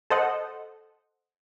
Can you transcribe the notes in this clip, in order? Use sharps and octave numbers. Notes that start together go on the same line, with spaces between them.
A4 C5 D#5 F#5